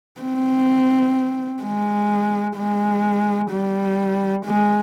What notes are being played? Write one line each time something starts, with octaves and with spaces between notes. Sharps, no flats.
C4
G#3
G#3
G3
G#3